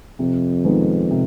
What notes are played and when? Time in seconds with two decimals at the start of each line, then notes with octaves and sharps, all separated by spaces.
0.19 F2 C3
0.65 D#3 G#3 B3
1.11 C3